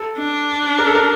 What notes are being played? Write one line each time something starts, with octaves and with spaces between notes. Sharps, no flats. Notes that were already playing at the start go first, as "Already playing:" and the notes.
Already playing: A4
D4
A#4
A4
A#4